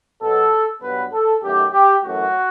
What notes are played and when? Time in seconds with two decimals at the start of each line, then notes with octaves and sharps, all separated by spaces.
0.21 B2 F#3 B3 A4
0.82 G2 F#3 B3 B4
1.12 A4
1.43 F#2 D#3 A3 G4
1.72 G4
2.03 F#2 E3 A3 F#4